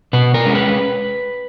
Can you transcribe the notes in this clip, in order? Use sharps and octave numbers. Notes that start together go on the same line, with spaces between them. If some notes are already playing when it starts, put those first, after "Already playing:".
B2 B4
A#4
G#3 C#4
B4